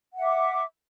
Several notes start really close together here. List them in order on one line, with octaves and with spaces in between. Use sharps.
F#5 E5 D6